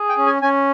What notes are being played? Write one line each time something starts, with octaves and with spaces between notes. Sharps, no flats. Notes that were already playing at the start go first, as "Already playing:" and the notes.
Already playing: G#4
G5
C#4
G#5
C#4 G#5